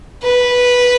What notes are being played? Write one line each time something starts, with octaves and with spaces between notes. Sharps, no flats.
B4